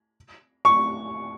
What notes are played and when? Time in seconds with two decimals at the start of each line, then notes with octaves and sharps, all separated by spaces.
0.65 C#6